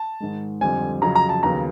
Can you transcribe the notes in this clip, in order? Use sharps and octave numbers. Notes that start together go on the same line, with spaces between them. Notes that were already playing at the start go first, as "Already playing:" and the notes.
Already playing: A5
G#2 D#3 G#3
F2 D3 G3 C4 G#5
F2 C#3 F#3 A#5
A#5
A5
D#2 C#3 F#3 B3 A#5